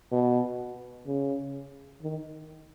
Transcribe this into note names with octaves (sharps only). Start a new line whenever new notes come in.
B2
C#3
D#3